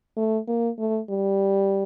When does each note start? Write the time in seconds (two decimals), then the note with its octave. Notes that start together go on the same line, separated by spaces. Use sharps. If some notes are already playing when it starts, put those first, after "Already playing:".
0.17 A3
0.48 A#3
0.78 A3
1.10 G3